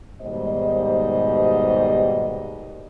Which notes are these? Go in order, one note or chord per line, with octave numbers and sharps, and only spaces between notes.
D#2 G#2 B2 G3 C5 D#5